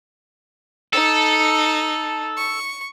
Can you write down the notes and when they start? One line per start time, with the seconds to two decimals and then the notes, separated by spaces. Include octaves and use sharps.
0.93 D#4 A4
2.37 C#6